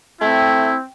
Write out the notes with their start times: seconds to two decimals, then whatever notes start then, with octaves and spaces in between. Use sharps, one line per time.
0.21 A3 C4 E4 G5